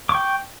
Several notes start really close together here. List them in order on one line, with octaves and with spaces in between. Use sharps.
D6 C#6 G5